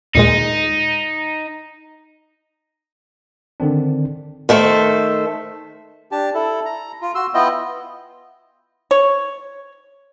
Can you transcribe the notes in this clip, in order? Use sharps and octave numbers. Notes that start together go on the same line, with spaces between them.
D#2 A#2 G#3 D#4
D3 D#3 C4 D4
D#3 A3 A4 C5
D4 G4 A5
E4 A4
A#5
F4
F#4 C6 E6
B3 E4 F4 D#5 G5
C#5